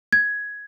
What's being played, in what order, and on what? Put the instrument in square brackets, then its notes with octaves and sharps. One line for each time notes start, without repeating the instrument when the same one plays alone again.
[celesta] G#6